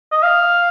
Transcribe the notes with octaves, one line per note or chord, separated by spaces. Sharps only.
D#5
F5